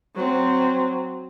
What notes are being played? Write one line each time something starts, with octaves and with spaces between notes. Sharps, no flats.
F#3 C4